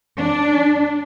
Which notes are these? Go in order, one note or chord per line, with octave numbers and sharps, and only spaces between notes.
D4